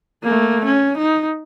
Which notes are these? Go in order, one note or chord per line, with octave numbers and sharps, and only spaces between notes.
A3 A#3
C#4
D#4